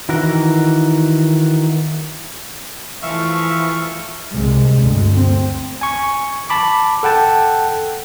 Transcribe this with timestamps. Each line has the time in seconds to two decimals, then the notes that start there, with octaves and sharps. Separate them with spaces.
0.09 D#3 E3 F#4 A#4
3.02 E3 F3 A3 E5 F5 C#6
4.34 C2 C3 G#3
4.77 G1 D2
5.15 C4
5.81 G#5 C#6
6.50 A5 B5 D6
7.03 A4 F#5 G5 A5